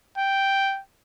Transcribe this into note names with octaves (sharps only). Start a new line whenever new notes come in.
G5